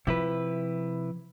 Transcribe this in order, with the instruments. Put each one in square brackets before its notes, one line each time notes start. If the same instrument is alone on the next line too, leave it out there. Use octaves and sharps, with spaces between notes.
[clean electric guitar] C3 E4 B4 [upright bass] F3